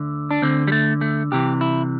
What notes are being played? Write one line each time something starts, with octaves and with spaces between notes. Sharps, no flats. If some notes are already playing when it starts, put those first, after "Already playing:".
Already playing: D2 D3
D4
D2 D3 C4
G3
A3
A3
C2 C3 E3 G4
E4